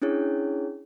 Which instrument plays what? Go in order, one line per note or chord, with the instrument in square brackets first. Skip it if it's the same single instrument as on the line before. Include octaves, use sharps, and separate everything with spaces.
[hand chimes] C#4 D4 E4 G#4 C#5